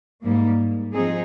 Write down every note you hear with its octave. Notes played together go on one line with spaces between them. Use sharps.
G#2 G3 A#3
F3 C4 D#4 G#4